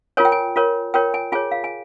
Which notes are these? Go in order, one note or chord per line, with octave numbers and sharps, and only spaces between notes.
F4 A#4 C#5 G#5
G5
G#5
F4 A#4 C#5
F4 A#4 C#5 G5
G#5
F4 G#4 C#5 G#5
F5
G#5